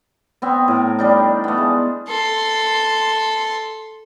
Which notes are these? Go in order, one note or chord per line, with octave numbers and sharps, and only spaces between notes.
B3 C4 E5
A2 A#4
G3 D4 D#4
A3 B3
G#3
A4 C6